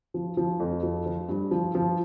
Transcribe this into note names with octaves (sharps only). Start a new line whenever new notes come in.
F3
F3
F2
F3
F3
G2
F3
F3